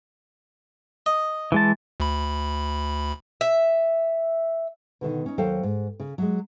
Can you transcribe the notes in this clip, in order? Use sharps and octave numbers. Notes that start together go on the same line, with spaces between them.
D#5
E3 G#3 A5
D2 B5
E5
B2 D3 D#3
C#4 D#4
D#2 F#3 A4 C5 F5 G5
G#2
C#3
F#3 G#3